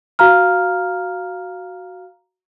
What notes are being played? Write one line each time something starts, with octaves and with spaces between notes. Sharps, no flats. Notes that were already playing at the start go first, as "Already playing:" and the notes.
F#4 F5 A#5 F6